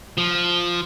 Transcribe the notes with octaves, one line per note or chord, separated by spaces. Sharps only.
F3